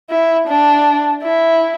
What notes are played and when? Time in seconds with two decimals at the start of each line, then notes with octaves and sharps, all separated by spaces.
0.10 E4
0.48 D4
1.23 E4